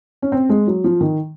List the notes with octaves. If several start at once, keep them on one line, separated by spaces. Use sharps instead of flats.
C#4
C4
G#3
F#3
F3
D#3